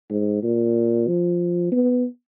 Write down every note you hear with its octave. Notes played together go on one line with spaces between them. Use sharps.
G#2
A#2
F3
B3